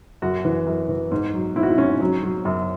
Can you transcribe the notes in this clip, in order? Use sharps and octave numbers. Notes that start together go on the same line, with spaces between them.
F#2 F#4
E3
F#2
E3
G#2
F#3
G#2 E4
F#4
E4
G#2 C#4
F#3
F#3
F#2